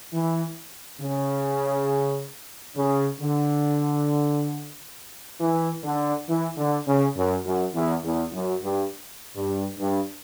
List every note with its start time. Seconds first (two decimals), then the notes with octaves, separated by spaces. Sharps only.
0.13 E3
1.01 C#3
2.76 C#3
3.20 D3
5.40 E3
5.84 D3
6.28 E3
6.57 D3
6.87 C#3
7.16 F#2
7.46 F#2
7.74 E2
8.04 E2
8.33 F#2
8.63 G2
9.35 G2
9.79 G2